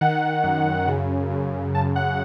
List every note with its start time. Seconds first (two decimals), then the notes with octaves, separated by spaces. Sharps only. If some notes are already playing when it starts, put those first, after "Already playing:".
0.01 D#3 F#5
0.44 F#2
0.88 C#3
1.30 F#2
1.74 F#2 A5
1.96 F#5